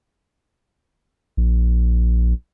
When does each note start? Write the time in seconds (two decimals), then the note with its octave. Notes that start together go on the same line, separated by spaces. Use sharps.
1.37 A#1